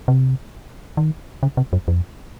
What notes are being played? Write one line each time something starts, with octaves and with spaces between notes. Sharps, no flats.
C3
D#3
C#3
C3
F#2
F2